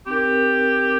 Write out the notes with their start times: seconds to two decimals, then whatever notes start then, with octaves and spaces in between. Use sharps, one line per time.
0.06 C4 D#4 G4 A#4